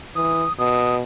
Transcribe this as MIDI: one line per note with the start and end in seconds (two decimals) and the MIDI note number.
0.16 0.45 52
0.16 0.53 87
0.59 1.03 47
0.59 0.96 87